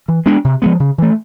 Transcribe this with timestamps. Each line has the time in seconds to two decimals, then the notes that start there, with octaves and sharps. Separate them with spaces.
0.08 E3
0.26 G#3 B3 D4
0.44 C3
0.62 F3 G#3 B3
0.80 C#3
0.98 E3 A3